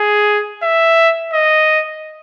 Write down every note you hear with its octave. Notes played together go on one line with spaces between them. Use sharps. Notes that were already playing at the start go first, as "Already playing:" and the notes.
Already playing: G#4
E5
D#5